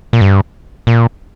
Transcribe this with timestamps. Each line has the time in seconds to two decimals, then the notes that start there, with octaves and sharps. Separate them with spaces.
0.13 A#2
0.21 G2
0.87 A#2